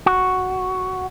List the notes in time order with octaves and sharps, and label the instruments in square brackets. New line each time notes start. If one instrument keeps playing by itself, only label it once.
[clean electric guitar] F#4